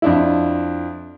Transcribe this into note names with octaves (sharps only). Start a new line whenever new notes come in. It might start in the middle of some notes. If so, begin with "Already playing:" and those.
F2 D4 E4